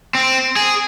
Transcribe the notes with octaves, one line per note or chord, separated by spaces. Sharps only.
C4
G#4